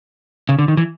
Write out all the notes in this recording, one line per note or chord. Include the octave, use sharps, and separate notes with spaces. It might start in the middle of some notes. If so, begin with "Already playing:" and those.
C#3
D3
D#3
E3